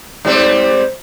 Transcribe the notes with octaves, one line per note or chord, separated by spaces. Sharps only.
G#2 G3 C4